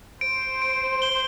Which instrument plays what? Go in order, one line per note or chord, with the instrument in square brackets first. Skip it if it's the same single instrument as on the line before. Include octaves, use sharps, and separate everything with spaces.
[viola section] C5 [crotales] D7
[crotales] D7
G7